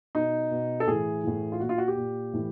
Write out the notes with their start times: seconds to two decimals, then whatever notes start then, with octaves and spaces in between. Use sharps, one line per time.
0.15 B2 D#4
0.51 B2
0.80 A4
0.87 A2 E3 G#4
1.24 A2 E3
1.52 F4
1.60 A#2 F#4
1.69 F4
1.78 F#4
1.88 G4
1.97 A#2
2.33 A2 E3